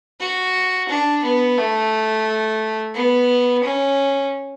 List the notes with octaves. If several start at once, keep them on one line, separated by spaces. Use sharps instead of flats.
F#4
D4
B3
A3
B3
C#4